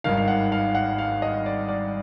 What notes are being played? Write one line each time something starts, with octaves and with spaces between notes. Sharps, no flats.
G#1 G2 D#3 F5
F5
F#5
F5
F#5
F5
D#5
D5
D5